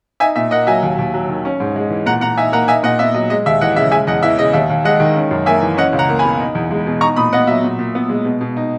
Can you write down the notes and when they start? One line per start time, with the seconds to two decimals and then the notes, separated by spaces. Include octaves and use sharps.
0.20 D#4 E5 G#5
0.36 A#2 E5
0.51 A#3 D#5 F#5
0.67 F#3 E5 G#5
0.83 D#2
0.99 D#2
1.14 F#3
1.29 D#3
1.45 C#4
1.60 G#2
1.76 G#3
1.90 E3
2.06 A#2 F#5 A#5
2.21 A#2 F#5 A#5
2.37 D#4 E5 G#5
2.52 A#3 F#5 A#5
2.68 D#4 E5 G#5
2.83 A#2 D#5 F#5
2.99 B3 E5
3.14 F#3 D#5
3.30 G#3 D#5
3.46 D#2 E5
3.61 E3 D#5 F#5
3.76 C#3 E5
3.91 G#3 E5 G#5
4.07 E2 D#5 F#5
4.23 E3 E5
4.39 C#3 D#5
4.53 D#2 E5
4.70 D#2
4.85 G#3 D#5 F#5
5.00 D#3
5.16 C#4
5.31 F#2
5.46 A#3 E5 G#5
5.62 E3
5.77 C#4 D#5 F#5
5.93 C#2
5.99 F#5 A#5
6.09 A#3
6.19 B2 G#5 B5
6.40 D#4
6.55 E2
6.71 G#3
6.86 B2
7.01 D#4 A#5 C#6
7.16 A#2 B5 D#6
7.33 B3 D#5 F#5
7.47 F#3 E5
7.64 A#2
7.79 A#2
7.95 B3
8.09 G#3
8.25 B2
8.41 B2
8.56 D#4